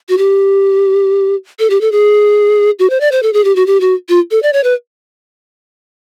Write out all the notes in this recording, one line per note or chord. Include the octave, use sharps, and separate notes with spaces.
F#4
G4
A4
G4
A4
G#4
F#4
C5
D5
C5
A4
G#4
G4
F#4
G4
F#4
F4
A4
D5
C#5
B4